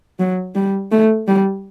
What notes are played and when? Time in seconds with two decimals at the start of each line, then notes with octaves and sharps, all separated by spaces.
0.19 F#3
0.55 G3
0.91 A3
1.27 G3